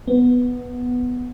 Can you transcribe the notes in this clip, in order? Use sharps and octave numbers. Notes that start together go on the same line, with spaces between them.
B3